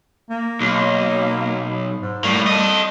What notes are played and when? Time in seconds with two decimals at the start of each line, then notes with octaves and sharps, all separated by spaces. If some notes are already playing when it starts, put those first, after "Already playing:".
0.30 A#3
0.61 B1
2.01 G#2
2.24 A2 G3 A#3
2.47 A4 D#5